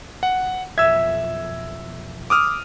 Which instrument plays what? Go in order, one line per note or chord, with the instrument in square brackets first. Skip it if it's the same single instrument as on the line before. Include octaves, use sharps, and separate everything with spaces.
[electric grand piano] F#5
[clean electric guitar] B1 F2 E5 [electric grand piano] E6 G#6
[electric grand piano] D6 D#6 F6